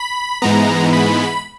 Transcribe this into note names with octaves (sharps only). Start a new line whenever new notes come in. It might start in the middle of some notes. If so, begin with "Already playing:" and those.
Already playing: B5
G#2 E3 G#3 B3 A#5
B5